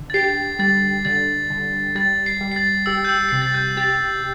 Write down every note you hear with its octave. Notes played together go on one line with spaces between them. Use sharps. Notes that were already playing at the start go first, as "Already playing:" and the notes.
Already playing: D3
A6
G4 C7
G3 A6
D3 A6
D3
G3 A6
C7
G3
C7
A6
G4 E6
G6
E6
C3 C7
A6
G6
G4 A6